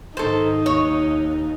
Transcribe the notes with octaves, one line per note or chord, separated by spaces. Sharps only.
G#2 D#3 D#4 A4 C5
D#2 C#5